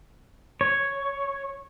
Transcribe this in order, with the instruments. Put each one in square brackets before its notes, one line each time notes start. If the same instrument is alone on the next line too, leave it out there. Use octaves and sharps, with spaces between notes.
[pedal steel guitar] C#5